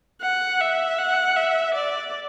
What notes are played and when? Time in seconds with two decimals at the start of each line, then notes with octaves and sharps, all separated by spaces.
0.22 F#5
0.61 E5
0.99 F#5
1.36 E5
1.74 D5